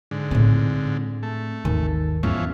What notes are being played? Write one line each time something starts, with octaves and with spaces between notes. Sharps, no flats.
G#2 D3
A2 C4
A3
G#1 D#2 D#3
E2 G#2 E3 F3 C#4